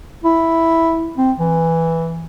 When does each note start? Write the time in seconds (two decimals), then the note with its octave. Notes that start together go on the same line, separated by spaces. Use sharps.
0.24 E4
1.17 C4
1.39 E3